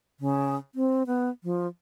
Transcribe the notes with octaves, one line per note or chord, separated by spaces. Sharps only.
C#3
C4
B3
F3